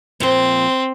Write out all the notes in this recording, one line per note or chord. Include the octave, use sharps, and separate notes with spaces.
A#2 F3 C4